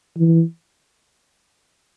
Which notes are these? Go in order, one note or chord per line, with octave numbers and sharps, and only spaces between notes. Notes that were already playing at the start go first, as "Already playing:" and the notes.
E3